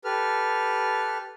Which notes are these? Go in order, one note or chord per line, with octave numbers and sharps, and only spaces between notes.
G4 A4 B4 F6